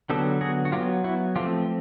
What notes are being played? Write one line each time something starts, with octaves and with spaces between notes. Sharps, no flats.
D3 F#3 B3 G4 A4
F#4 G#4
F#4
F#3 B3 F4 G4
E4 F#4
F3 A3 C4 F4 G4